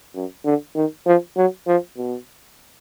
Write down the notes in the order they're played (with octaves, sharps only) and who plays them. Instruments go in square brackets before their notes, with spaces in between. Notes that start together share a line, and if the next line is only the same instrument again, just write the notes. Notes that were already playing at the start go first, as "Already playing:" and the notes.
[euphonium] F#2
D3
D#3
F3
F#3
F3
B2